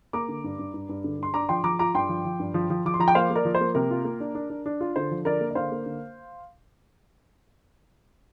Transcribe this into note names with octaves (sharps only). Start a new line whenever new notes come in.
A#3 A#5 D6
D3
G2
G2
G2
G2
D3
G2 C6
D4 A#5 D6
F3 G5 C6
F3 A#5 D6
F4 A#5 D6
G2 G5 C6
F3
F3
G2
F3
F3
F3 D6
C6
F3 A#5
G5
A#3 C5 F5
A#3
A#4 D5
F3
C5
A#3
C3 A#4
F4
A#3
D4
D4
D4
D4
F4
D3 C5
F3
D3 A#4 D5
A#3
D5
D3 C5 F5
A#3
D3